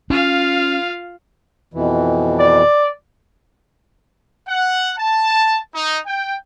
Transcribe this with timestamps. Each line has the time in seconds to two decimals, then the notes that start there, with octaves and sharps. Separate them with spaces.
0.10 C#4 F4 F5
1.74 F2 B2 E3
2.40 D5
4.48 F#5
4.98 A5
5.75 D#4
6.06 G5